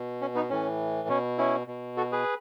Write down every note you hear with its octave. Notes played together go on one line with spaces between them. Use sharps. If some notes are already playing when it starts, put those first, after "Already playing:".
Already playing: B2
C#4
B3 D#4
A2 E3 C#4
B2 C#4
C#4 E4
B2
F#4 A4
G#4 B4